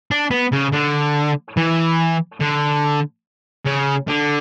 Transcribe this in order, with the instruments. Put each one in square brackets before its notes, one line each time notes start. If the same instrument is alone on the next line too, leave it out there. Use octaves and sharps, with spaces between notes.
[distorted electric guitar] D4
B3
C#3
D3
E3
D3
C#3
D3